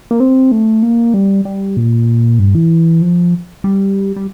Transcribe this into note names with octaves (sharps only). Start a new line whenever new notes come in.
A#3
C4
A3
A#3
G3
G3
A#2
G2
E3
F3
G3
G3